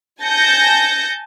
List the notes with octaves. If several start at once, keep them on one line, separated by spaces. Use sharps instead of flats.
G#5 A5 G6 A#6 C#7